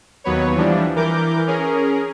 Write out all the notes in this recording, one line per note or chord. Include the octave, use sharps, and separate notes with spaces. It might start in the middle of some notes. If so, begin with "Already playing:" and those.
D#2 F#3 B3 B4 C#5
E3 F3 G3 D4
E3 A#4 D6 G6
C#4 G#4 A#4